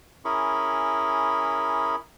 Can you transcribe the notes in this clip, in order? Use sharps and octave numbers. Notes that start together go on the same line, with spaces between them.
C#4 E4 G#4 A#4 B5 C#6